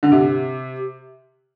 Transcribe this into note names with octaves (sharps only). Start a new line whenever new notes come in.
D3
C3